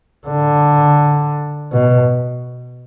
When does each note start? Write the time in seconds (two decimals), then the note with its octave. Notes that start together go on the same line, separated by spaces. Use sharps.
0.28 D3
1.72 B2